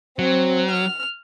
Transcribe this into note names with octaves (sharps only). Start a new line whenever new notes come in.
F#3 C4
F6